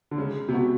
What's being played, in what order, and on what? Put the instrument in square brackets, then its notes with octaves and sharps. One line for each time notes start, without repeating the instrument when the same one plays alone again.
[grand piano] D3
[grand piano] C#3 [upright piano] G#3
[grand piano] C3
[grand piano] B2 [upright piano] F#4